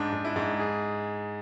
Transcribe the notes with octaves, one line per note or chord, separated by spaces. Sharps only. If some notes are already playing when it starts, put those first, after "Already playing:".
Already playing: G#2 D4
G#2
E4
G#2
G#4